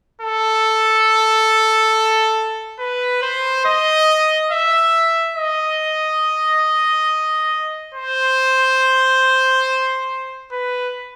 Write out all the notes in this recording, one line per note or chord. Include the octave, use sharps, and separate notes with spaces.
A4
B4
C5
D#5
E5
D#5
C5
B4